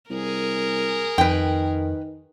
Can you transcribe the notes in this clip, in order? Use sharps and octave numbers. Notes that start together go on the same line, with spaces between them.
C2 G#4 A#4
F2 D#3 B4 G5